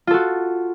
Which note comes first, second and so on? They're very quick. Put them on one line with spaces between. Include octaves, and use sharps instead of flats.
F4 A4 F#4